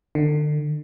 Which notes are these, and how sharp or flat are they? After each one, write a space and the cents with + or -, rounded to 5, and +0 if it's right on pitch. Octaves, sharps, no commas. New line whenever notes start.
D3 +35